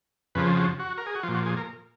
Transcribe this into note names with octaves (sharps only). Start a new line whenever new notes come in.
F2 C#3 F3 B4
F#4
F#4
A#4
G#4
F#4
F3 F4
A#2
F#4
G#4
A#4